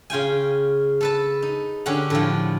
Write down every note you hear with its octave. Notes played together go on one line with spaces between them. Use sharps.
C#3 F4 G5 G#5
A4 B4 A5
D#4
D3 C#4 G4 C#5 F#5
A2 D3 F3